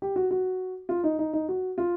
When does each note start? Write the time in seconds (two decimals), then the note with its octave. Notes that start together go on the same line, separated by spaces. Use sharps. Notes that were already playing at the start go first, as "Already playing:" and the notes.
0.02 G4
0.16 F#4
0.31 F#4
0.89 F4
1.04 D#4
1.19 D#4
1.33 D#4
1.49 F#4
1.78 F4